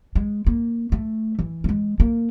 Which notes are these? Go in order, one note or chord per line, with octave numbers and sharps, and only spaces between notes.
G#3
A#3
A3
E3
A3
G#3
A#3